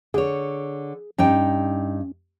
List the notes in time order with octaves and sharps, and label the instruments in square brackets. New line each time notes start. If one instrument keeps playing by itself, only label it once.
[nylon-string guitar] D3 C#5 [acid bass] G#4
[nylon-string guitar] G2 D#4 G5 [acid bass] C#4